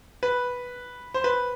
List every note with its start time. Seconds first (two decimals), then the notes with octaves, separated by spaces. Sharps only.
0.23 B4
1.14 C5
1.24 B4